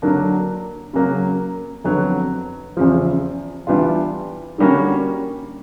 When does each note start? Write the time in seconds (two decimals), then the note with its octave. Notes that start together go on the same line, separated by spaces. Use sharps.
0.02 D3 F#3 A#3 D4
0.93 C#3 F#3 A#3
1.84 F2 D3 F#3 B3
2.77 E2 C#3 F3
3.67 E3 G3 B3 D4 F4
4.58 D3 G3 A#3 C#4 F#4